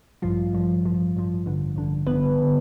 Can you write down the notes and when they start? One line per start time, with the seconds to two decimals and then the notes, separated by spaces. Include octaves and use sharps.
0.22 A1 G2 F3 F4
0.53 A1 G2 F3
0.84 A1 G2 F3
1.15 A1 G2 F3
1.46 A1 G2 D3
1.76 A1 G2 D3
2.07 A1 G2 D3 B3 B4
2.40 D3